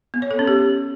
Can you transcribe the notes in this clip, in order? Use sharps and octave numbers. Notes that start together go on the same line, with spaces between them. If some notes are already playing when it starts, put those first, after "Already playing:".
B3
C#5
A4
C#4
G4